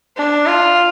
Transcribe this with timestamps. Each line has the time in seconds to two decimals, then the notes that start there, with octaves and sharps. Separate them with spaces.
0.17 D4
0.47 F4